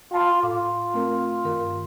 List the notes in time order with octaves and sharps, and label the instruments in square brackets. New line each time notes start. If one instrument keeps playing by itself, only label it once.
[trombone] F4 [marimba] G5 A5 B5
[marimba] A2 D6 [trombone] F4
[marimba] A3 C4 A#4
G2 D#3 A#4